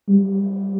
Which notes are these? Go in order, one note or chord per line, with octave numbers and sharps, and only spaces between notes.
G3